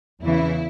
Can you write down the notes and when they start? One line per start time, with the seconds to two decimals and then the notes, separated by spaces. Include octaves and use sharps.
0.23 E2 C#3 E3 E4